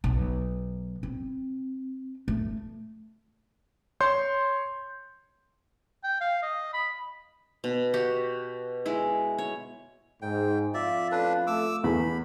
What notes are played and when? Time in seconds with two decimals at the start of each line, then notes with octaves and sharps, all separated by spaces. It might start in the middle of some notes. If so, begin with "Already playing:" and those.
0.04 B1
1.03 C4
2.28 A3
4.01 C#5 C6 G6
6.04 G5
6.21 F5
6.43 D#5
6.74 B5
7.64 B2
7.94 F#4 G4
8.86 G#3 E4
9.38 C#5
10.22 G#2 G5
10.74 F2 F4 D5 E5
11.12 A2 C#4 D4 A4 B4
11.47 A3 D6 E6
11.84 E2 B5